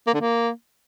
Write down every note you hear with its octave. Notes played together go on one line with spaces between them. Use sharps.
A#3
D3
A#3